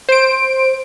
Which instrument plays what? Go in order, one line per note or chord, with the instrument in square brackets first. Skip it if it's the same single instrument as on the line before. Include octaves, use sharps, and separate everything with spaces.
[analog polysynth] C5 D7